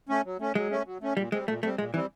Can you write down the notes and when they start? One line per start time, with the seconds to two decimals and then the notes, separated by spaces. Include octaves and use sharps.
0.09 A3 C#4
0.25 F#3
0.39 A3 C#4
0.55 F#3 G#3
0.70 A3 C#4
0.86 F#3
1.01 A3 C#4
1.17 A#2 G3
1.32 G#3 C4
1.36 G3
1.48 A#2 A3
1.63 G3 A3 C4
1.78 A#2 G#3
1.94 E3 G3 C4